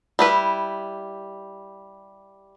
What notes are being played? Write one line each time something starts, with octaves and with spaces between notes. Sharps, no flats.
G3 E4 B4